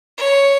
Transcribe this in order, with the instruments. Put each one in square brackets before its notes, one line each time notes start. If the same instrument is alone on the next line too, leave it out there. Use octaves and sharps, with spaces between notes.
[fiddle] C#5